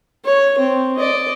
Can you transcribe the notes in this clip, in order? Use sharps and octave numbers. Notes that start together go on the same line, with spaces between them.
C#5
C4
D5 D#5